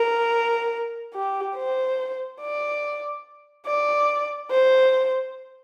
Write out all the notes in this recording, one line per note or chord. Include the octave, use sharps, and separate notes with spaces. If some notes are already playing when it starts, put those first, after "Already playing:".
Already playing: A#4
G4
C5
D5
D5
C5